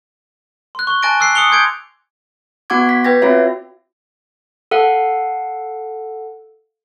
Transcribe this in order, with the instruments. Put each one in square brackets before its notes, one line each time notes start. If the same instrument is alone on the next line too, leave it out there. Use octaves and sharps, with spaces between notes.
[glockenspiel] C6 F#6
C#6 G7
G#5 A5 F#6 A6 A#6 D7
D6 E6 F#6 C7
D6 D#6 C#7 F7 G7
C6 D6 G6 G#6 D7
[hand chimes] B3 F#4 F#5 C#6 D6 G#6
B6
B4 G5 G#6 A#6
C4 F4 F#4 C#5 E5
[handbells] A4 F5 F#5